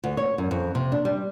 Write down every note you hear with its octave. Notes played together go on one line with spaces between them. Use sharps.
D2
C#5
F#2
F2
C3
D4
G3